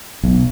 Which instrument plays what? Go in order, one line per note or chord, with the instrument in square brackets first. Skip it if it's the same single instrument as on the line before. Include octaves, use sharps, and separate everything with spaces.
[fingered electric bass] B1